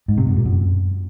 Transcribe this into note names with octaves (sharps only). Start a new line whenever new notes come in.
G#2
C3
F#2
A#2
F#2